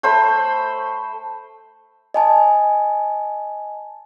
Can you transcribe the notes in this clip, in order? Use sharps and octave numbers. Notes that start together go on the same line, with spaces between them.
A3 C5 B5
D#5 G#5 A5